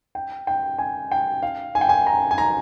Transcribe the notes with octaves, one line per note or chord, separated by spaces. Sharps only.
G5
G5
G#5
G5
F5
G#5
G5
G#5
A#5
G#5
A#5